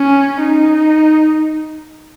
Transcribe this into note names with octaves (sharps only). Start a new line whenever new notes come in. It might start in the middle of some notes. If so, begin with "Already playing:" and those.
Already playing: C#4
D#4